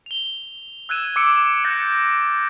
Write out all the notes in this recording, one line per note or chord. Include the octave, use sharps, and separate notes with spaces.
F7 G7
E6 F#6 G#6 D#7 E7
D6 E6 C#7 D7
F#6 G6 A6 A#6 C#7 D7